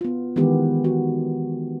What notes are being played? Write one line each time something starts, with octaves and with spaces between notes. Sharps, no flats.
B3 F4
D#3 E3 G#3 B3 G4
F#4